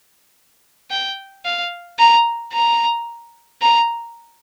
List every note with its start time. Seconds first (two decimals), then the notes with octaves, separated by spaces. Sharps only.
0.91 G5
1.45 F5
1.99 A#5
2.53 A#5
3.62 A#5